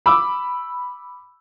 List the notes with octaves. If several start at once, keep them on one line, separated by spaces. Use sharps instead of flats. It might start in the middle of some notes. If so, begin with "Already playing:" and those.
B5 D6 E6